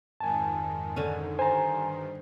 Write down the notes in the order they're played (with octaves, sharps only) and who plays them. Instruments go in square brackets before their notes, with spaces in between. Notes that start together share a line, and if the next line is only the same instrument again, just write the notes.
[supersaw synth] F2 G#2 D#3 [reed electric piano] G#5 A5
[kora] D3 C#4
[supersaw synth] G2 D#3 [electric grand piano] C5 [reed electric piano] G#5 A#5